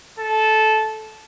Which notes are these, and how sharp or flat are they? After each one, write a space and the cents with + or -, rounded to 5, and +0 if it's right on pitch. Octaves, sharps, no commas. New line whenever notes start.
A4 -15